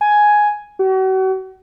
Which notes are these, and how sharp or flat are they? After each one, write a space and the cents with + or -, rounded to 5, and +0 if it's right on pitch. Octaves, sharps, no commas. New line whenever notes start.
G#5 +5
F#4 +40